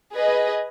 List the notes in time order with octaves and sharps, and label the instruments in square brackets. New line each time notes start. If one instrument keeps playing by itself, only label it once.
[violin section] G#4 B4 D#5